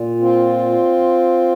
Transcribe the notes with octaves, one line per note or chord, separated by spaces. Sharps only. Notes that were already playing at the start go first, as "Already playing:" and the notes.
Already playing: A#2
C4 F4